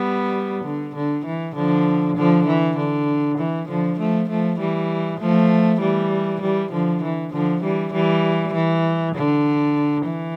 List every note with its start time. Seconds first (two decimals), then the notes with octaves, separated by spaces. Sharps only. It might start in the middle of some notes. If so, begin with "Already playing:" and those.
Already playing: G3 B3
0.64 D3
0.95 D3
1.26 E3
1.55 D3 F3
2.17 D3 F3
2.47 E3
2.77 D3
3.38 E3
3.68 D3 F3
3.99 F3 A3
4.29 F3 A3
4.60 E3 G3
5.20 F3 A3
5.81 E3 G3
6.42 E3 G3
6.72 D3 F3
7.03 E3
7.33 D3 F3
7.63 E3 G3
7.93 E3 G3
8.54 E3
9.16 D3
10.06 E3